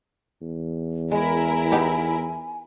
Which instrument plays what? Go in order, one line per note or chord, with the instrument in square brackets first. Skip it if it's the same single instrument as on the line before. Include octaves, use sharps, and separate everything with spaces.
[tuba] E2
[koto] G#3 [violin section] E4 A#4 [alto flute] G#5
[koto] B3 D#4 G4